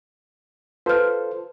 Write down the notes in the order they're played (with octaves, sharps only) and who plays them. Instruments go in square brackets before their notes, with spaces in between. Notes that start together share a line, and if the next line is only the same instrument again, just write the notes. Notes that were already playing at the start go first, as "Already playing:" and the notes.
[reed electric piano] F4 A4 C5 [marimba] B4 F6